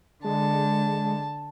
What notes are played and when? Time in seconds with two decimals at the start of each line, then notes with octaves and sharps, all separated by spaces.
0.24 D3 G#3 A5